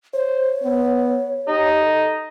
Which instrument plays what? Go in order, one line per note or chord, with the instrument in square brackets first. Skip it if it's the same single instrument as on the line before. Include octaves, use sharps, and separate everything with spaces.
[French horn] C5 [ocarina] C#5
[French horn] B3
[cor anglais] D#4 [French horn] G4
[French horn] A4